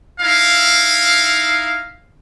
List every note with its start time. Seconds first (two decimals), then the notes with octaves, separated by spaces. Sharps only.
0.20 D#4 E4 F5